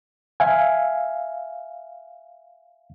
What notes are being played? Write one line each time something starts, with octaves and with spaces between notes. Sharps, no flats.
E5 F5 G#5